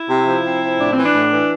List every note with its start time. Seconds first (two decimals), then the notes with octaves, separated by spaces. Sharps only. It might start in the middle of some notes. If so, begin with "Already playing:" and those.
Already playing: E4
0.10 C3
0.27 F3
0.44 C3
0.62 F3
0.79 A2 D4
0.92 E3 C4
1.03 D4
1.14 A2
1.31 E3